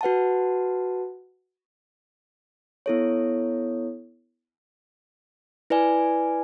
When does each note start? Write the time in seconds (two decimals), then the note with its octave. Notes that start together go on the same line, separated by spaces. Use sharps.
0.01 F#4 B4 F#5 A5
2.86 B3 E4 A4 C#5
5.70 E4 B4 D5 G#5